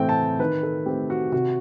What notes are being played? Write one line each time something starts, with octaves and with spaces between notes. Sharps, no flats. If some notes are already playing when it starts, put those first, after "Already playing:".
Already playing: A2 E3 A3 C4 G5
A5
D#3 B4
A4
A3 C4 G4
F#4
C3 F#4